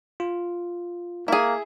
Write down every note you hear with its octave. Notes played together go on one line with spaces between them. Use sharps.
F4
A#3 E4 G#4